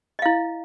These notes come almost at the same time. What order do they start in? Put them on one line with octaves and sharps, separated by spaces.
D#5 F5 E4